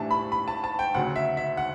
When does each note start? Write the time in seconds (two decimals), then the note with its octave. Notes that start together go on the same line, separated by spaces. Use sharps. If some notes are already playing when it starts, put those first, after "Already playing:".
Already playing: A2 E3 G3 D4 E5 A5
0.11 B5
0.32 B5
0.48 A5
0.64 A5
0.79 G5
0.94 D2 C#3 F#3 F#5
1.16 E5
1.37 E5
1.57 F#5